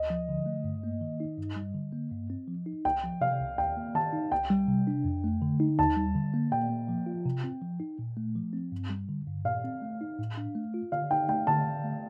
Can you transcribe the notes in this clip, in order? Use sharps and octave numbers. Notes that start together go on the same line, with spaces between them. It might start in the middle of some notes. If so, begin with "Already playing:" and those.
Already playing: D2 D#5
F3
D3
A3
G2
A#3
D#3
D#4
G2
G3
D3
A#3
G2
C4
F3
D#4
C2 G5
F3
C3 F5
C2
D#2 G5
A#3
D#3 A5
D#4
C2 G5
G3
C3
D4
F2
A3
D3
D#4
D#2 A5
G3
D3
A#3
A#2 G5
A#3
F3
F4
C3
C4
F3
D#4
A#2
A3
F3
C4
G2
G3
D3
G2
A#2 F5
C4
A3
D#4
A2
D4
A3
F4
D3 F5
D#4 G5
A3 G5
D3 A5
D3
A3